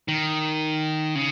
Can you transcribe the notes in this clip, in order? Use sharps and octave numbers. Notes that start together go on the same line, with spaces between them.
D#3
C#3